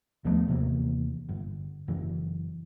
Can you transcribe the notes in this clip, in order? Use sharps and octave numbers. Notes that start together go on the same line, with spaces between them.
D#2 F3 A3 B3
D#2 C3 E3 A#3
G1
F#1 E3